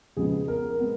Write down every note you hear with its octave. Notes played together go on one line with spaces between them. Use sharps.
C#3 F3 G#3 B3 G#4
A#4
G#3 B3